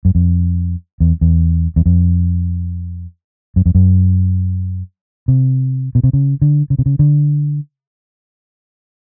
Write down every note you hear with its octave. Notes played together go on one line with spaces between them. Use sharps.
F#2
F2
E2
E2
E2
F2
F#2
F2
F#2
C3
B2
C3
C#3
D3
C#3
C3
C#3
D3